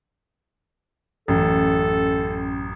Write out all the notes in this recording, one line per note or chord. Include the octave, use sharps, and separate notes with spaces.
A1 F#2 A4